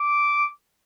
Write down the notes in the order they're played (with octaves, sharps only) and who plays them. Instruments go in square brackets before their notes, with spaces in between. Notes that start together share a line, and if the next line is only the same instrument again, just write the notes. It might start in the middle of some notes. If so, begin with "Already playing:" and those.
Already playing: [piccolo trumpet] D6